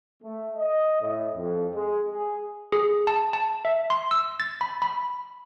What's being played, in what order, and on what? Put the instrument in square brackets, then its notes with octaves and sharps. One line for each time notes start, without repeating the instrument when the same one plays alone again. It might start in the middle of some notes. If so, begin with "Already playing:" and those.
[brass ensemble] A3
D#5
A2
F2
G#3
G#4
[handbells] G#4
A5
A5
E5
C6
E6
A6
B5
B5